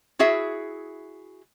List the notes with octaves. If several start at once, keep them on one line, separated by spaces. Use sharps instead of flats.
E4 F#4 G#4 E5